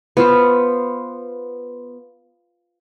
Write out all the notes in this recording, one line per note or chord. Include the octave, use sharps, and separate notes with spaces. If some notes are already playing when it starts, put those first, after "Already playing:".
B3 F4 C5